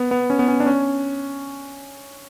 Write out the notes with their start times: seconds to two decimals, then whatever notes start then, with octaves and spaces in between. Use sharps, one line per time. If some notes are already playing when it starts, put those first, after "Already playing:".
Already playing: B3
0.11 B3
0.30 C#4
0.39 B3
0.48 C#4
0.60 D4
0.66 C#4